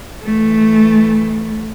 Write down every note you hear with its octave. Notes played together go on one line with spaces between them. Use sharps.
E3 A3